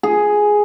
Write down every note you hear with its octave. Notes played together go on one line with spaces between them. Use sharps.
G#4